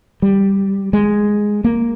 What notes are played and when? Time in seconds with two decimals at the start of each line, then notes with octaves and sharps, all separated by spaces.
0.22 G3
0.93 G#3
1.64 A#3